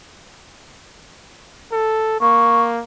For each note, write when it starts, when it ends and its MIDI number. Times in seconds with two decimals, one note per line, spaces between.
1.72 2.20 69
2.20 2.83 58
2.20 2.62 85